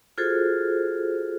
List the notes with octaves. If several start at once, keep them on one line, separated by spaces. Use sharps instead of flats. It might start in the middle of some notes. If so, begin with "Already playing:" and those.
F4 F#4 G#4 A4 C5